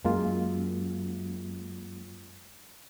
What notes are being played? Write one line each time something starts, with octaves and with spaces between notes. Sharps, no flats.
F#2 G#3 A#3 F4